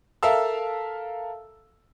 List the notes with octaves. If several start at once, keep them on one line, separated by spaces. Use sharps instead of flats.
A4 A#4 E5 F5 A5 E6